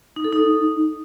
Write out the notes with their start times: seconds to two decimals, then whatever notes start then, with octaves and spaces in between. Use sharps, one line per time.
0.16 D#4
0.24 A4
0.32 D#4